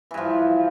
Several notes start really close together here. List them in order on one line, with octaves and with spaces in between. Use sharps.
E3 G2 F3